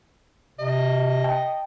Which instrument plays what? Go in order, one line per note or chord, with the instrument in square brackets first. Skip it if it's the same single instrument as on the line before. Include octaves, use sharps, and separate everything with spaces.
[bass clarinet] C3 [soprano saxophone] D#5
[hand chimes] G5 A5